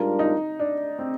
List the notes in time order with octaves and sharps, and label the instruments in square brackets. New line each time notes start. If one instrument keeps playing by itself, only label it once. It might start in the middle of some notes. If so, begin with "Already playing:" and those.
Already playing: [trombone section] G#2 G3 D4 F4 A#4
[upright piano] D#4
D4
C4